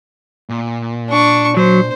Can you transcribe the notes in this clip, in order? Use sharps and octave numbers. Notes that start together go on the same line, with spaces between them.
A#2
D4 C#6
F#3 C5